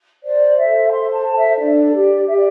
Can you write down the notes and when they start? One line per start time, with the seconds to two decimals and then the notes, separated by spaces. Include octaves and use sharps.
0.22 C5 D5
0.57 A4 E5
0.90 C5 C6
1.12 A5
1.24 A4
1.36 E5
1.58 D4 D5
1.92 G4
2.25 G4 E5
2.35 D5